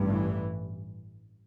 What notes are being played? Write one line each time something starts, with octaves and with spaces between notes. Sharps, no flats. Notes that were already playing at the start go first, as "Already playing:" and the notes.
Already playing: A1 G2
E3